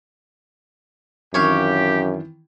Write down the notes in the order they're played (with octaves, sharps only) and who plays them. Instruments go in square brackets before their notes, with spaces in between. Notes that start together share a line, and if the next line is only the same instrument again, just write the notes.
[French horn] F#2 [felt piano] D#3 E3 C4 [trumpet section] G4 [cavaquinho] C#5 F5 C#6